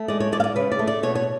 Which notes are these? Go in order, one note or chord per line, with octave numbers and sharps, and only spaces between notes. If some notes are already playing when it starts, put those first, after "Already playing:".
Already playing: A3
G#3 D5
C#5
G#3 D5
F5
D5
C#3 B4
D5
A3
D5
B2 C#5
C#5